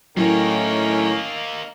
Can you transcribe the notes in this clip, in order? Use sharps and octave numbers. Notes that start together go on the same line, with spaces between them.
A2 D#3 F#3 A#3 C#4 D#4 E4